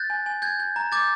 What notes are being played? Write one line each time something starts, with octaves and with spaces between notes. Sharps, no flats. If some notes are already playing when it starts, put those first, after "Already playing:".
Already playing: F#6 G6 A6
G#5
G#5
G6 G#6
G6
A#5
D6 G6 A6